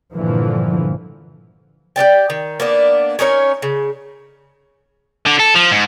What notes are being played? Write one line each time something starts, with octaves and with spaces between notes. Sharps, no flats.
G1 A#2 D3 E3 F3
G4 B4 D5 G5
D#3
A#3 B3 D4
C#4 D#4 A#4 C#5
C#3
D3
A4
F3
G#2